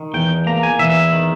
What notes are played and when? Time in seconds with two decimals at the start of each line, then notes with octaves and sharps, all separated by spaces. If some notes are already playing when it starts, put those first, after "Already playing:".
Already playing: D#3
0.14 E2 G5
0.47 A#3 A#5
0.63 G#5
0.79 E2 E5
1.13 D#3